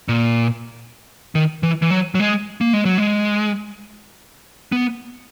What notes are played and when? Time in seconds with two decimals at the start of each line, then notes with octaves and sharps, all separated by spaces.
0.09 A#2
1.35 D#3
1.63 E3
1.82 E3
1.90 F#3
2.15 F#3
2.20 G#3
2.61 A#3
2.73 G#3
2.85 F#3
2.98 G#3
4.72 B3